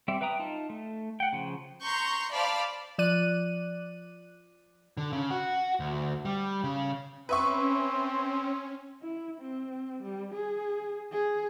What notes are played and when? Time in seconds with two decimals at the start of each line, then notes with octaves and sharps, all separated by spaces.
0.08 G3 C4 D5 E5
0.21 B4 E5 G5 A#5 D#6
0.39 D#4 F4 A5
0.70 A3
1.20 F#5 G5
1.33 C#3 F3
1.83 A#5 C6 C#6 G6
2.33 C5 D5 F5 A5 B5
2.98 F3 D5 F#6 D#7
4.97 D3
5.13 C#3
5.31 F#4
5.80 D2
6.25 G3
6.64 C#3
7.29 C4 C#4 B4 E5 C#6
9.02 E4
9.41 C4
10.03 G3
10.34 G#4
11.12 G#4